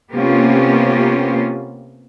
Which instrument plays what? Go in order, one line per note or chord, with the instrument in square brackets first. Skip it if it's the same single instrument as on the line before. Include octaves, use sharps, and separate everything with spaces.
[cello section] C3 A#3 B3 C#4 F4 G4